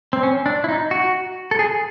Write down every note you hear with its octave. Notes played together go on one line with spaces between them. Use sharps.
C4
C#4
D4
E4
D#4
F#4
A4
G#4